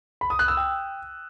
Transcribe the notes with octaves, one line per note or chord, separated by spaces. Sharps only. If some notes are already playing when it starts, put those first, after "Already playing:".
B5
D#6
F#6
E6
G5